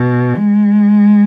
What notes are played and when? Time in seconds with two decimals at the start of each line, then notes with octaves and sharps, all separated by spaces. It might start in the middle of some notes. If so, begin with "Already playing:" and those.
Already playing: B2
0.37 G#3